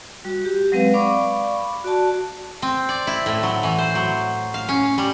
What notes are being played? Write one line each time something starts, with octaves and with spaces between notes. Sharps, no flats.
G3 F#4
G4
F#3 G#3 C4 B4 F5
D5 F5 B5 C#6 D6
F#4 D5 A5
C4
D5
E4
A2
F#3
E3
C5
F#3
F5
C#4
G3